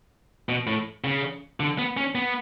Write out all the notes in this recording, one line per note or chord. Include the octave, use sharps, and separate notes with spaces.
B2
A2
C#3
D3
B3
C#4
B3